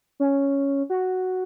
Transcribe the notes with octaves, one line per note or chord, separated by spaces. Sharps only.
C#4
F#4